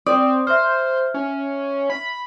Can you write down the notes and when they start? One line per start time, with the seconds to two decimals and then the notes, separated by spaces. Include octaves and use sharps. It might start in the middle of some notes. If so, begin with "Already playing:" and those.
0.06 C4 D5 D#6
0.47 C5 E5 F6
1.14 C#4
1.90 B5